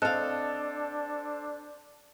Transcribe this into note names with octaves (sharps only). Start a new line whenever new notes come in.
C4 D4 A4 D#5 F5 F#6